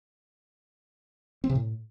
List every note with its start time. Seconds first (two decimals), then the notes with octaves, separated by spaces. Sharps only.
1.44 C4
1.49 C3
1.55 A2